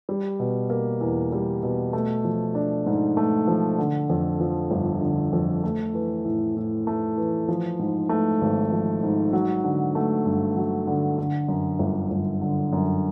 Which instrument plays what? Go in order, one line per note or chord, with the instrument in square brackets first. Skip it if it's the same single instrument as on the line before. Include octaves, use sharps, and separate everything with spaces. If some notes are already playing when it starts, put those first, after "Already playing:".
[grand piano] G3
B2
A#3
E2
G3
B2
A3
F3
D4
G#2
A3
F3
D3
F2
F3
G1
D3
F2
A3
E3
A2
A2
A3
E3
F3
G#2
A3
G#1
F3
G#2
F#3
D3
A3
G2
F#3
D3
D3
F#2
G1
G1
D3
F#2